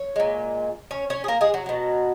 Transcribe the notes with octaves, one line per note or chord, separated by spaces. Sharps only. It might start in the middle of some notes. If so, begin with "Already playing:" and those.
Already playing: C#5
A#2 G#3
C#4 C#5
C#4 C#5
G#4
A#3 A#4
G#3 G#4
F#3 F#4
B2 F#3